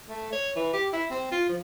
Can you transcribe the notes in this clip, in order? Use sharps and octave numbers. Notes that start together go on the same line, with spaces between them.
A3
C#5
E3
G4
E4
C4
F4
F3